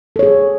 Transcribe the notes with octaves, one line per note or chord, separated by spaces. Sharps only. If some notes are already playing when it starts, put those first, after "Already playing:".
G#4 A4 C#5